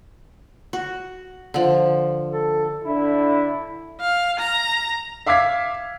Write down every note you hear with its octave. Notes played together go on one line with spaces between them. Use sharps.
F#4
D3 F3
A4
D3 E4
F5
A#5
E5 F5 D6 F6 G#6 B6